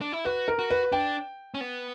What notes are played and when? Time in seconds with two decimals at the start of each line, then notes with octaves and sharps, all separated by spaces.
0.01 D4
0.12 E4
0.25 F#4 B4
0.48 A#4
0.59 F#4
0.70 B4
0.92 D4 G5
1.54 C#4
1.61 B3